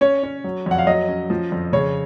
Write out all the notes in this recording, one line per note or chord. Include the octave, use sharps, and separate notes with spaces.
C#4 C#5
C#4
F#3
F2 F#5
F5
F#3 D#5
C#4
F3
F2
C#3 C#5